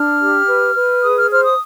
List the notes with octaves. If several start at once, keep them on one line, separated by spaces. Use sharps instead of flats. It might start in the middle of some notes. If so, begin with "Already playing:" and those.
Already playing: D4 F6
G4
B4
B4
G#4 D#6
F6
C5 F6
D#6